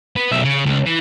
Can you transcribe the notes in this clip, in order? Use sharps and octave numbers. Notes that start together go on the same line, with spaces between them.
B3
B1 E5
C#3
C#2
E3